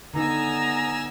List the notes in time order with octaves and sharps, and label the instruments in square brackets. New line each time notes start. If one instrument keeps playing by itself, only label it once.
[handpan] D3 D#4 [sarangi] B3 [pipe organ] G#5 E6 [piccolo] A#5